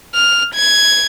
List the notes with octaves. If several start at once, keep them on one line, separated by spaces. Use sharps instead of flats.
F6
G#6